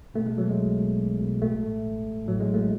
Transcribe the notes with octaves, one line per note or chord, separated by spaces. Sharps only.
B2 A3
G#3
B2 F#3
G#3
B1
B2
B1
B2
A1 A3
A2
A1
A1
A2 F#3
G#3
A1
A3